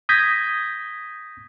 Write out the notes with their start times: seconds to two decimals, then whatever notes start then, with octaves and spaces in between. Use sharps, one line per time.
0.09 D#6 G6 G#6 A#6 B6